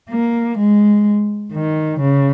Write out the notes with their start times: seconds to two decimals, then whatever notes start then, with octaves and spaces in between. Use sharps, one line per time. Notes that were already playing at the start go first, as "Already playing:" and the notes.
0.10 A#3
0.58 G#3
1.53 D#3
2.00 C#3